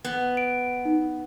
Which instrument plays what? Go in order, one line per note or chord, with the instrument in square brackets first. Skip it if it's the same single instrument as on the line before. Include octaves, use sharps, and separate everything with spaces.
[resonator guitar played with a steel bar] B3
[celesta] D7
D#4